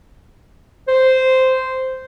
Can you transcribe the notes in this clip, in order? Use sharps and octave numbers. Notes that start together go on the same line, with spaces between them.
C5